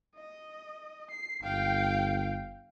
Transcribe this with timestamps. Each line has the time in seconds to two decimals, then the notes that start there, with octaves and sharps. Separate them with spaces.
0.15 D#5
1.11 C7
1.43 G1 F5 G5